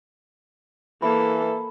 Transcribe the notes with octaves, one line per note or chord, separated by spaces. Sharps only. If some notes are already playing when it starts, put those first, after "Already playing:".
E3 A#3 A4 B5